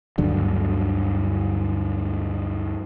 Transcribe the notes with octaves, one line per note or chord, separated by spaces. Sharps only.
D2 G2 D3 F#3